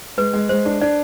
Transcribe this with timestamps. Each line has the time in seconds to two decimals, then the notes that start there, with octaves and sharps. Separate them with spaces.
0.18 G#3 B4
0.33 G#3
0.49 G#3 C5
0.65 D4
0.81 D4 D5